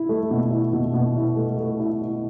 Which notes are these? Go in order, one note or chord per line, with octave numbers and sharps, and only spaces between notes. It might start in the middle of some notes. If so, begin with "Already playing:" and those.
Already playing: E4
A3
B2
E4
B2
B2
E4
A3
A3
E4
E4